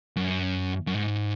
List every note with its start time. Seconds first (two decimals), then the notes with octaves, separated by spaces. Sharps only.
0.16 F#2
0.87 F#2
0.95 G#2